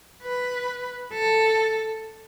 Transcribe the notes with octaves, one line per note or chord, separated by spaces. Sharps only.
B4
A4